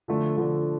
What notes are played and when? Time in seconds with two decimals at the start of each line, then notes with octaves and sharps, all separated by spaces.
0.08 D3 F3 A3
0.37 D3 F3 A3